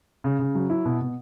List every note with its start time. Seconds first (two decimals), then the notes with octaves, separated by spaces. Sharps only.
0.24 C#3
0.39 C#3
0.55 F#3
0.70 E4
0.85 B2
1.01 B2